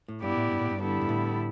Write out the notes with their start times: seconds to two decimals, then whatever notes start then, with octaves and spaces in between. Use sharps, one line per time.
0.08 A2
0.22 G2 B3 E4 G4 D5
0.37 A2
0.52 G2
0.61 A2
0.71 G2
0.80 D3 G3 B3 E4 A4
1.01 G2
1.09 A2